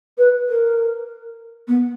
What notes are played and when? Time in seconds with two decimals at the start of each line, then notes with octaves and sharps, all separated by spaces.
0.17 B4
0.48 A#4
1.67 B3